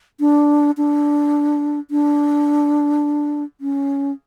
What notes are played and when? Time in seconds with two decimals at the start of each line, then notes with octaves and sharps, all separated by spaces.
0.20 D4
0.77 D4
1.91 D4
3.61 C#4